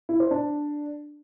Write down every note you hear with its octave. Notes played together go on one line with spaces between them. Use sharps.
E4
C5
D4